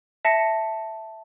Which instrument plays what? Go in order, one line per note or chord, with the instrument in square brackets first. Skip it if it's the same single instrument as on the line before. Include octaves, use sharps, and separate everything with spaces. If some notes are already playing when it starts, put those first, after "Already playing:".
[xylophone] E5 A5 A#6 C#7